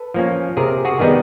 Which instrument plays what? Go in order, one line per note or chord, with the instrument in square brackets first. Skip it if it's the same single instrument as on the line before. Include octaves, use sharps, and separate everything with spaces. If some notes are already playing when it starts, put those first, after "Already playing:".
Already playing: [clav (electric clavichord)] A4 B4
F3 A#3 C#4
C3 G#4 A#4
F#4 G#4
D#3 G3 B3 D#4 G#4